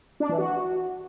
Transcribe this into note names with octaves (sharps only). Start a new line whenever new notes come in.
D4
E3
F#4